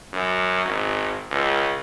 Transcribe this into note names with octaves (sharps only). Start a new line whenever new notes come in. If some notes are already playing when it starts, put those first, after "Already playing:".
F#2
G#1
C#2